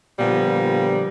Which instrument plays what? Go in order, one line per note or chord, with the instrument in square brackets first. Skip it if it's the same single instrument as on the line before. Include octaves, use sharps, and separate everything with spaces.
[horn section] A#2 D3 F3 G3 B3